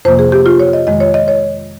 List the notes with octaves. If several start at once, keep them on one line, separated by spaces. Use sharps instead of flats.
F2 C3 F3 A#3 C5
G#4
G4
F4
C#5
D#5
F2 D#3 G#3 D#5
C#5
D#5
C#5